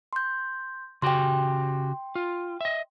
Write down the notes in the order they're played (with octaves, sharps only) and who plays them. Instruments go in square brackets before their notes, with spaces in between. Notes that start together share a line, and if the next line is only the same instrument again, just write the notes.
[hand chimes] C6 G6
[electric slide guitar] C#3 F#4 G4 [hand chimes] G5 C6
[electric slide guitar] F4
D#5 E5